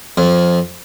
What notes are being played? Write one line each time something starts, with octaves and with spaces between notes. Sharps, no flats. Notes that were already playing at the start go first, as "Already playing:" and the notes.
F2